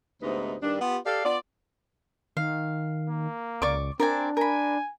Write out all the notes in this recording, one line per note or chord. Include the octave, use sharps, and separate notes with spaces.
D2 G#2 C3 B3 D#4
G2 D#3 D4
B3 F4 G4
G4 A4 D5 F5
B3 F4 D5
D#3 F5
A#3
C#2 D5 C#6 D6
C4 D4 A#4 D5 G#5
A#4 G#5 B5